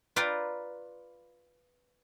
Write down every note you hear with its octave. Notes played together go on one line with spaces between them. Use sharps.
F4 B4 D5 F5 G5 A#5